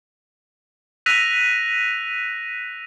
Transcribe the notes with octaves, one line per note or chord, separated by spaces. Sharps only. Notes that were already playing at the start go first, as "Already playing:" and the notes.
E6 F#6 A#6 B6 D#7 F7